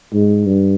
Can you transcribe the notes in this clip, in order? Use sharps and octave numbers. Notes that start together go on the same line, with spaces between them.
G#2
G2